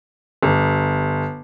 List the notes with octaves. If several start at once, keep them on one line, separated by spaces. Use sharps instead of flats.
G1